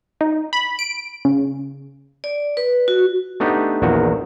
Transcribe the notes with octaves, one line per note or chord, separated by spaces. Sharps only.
D#4
B5
D7
C#3
D5
B4
F#4
A3 B3 D4 D#4 G4
A#1 E2 A#2 D#3 F#4